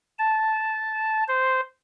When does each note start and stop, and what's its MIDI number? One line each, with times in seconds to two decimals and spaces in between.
0.19 1.24 81
1.28 1.61 72